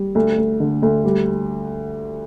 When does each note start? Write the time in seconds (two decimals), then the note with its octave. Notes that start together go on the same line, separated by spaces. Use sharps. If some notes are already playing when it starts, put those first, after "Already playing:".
Already playing: G3
0.15 D2
0.38 D2
0.60 D3
0.82 D2
1.04 G3